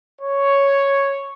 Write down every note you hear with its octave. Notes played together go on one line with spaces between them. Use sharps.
C#5